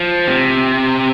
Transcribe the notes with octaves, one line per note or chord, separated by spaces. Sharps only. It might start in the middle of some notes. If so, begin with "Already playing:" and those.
Already playing: F3
C3